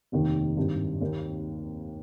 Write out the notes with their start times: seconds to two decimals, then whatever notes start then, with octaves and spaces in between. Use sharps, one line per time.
0.12 F1 D#2 D#3 A#3
0.57 G#1 G2 D#3
1.01 D#2 D#3 A#3